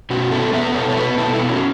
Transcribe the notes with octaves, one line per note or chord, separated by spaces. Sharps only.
B2 C#4 F#4
B3 E4 A4
B3 B4 E5
B2 A4 C#5
C#5
B3 F#4 B4
B2 E4 A4
E4
B3
C#4 F#4